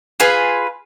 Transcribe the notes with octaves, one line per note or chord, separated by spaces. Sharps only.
F4 G#4 B4